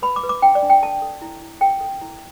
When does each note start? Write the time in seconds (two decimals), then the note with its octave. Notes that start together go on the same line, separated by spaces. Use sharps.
0.02 B4 B5
0.16 D6
0.23 B4
0.29 D6
0.42 D4 G5
0.55 D5
0.63 D4
0.70 G5
0.82 A4 A5
1.02 A4
1.22 E4
1.42 E4
1.61 A4 G5
1.81 A4
2.02 E4